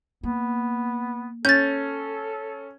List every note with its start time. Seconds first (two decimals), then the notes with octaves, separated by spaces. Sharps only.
0.23 A#3 B3
1.45 C#4 A4 G6 A6